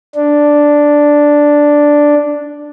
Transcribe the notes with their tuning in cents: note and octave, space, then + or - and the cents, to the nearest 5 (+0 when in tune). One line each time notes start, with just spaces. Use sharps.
D4 +0